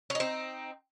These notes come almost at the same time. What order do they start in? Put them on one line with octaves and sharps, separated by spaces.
C#4 D#4 C4